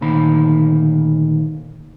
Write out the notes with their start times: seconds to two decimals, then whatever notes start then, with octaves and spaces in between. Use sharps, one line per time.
0.01 D2 A#2 D#3 B5